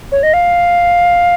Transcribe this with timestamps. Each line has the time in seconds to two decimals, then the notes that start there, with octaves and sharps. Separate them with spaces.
0.12 C#5
0.23 D#5
0.34 F5